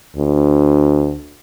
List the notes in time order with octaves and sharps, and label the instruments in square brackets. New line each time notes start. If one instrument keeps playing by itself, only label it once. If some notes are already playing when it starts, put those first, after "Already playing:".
[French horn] D2